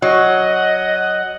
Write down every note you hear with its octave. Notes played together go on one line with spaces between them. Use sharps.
F#3 D#5 F#5